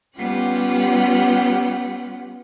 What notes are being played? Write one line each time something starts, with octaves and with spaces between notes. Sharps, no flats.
G3 B3 C#4 F4 G4 F#5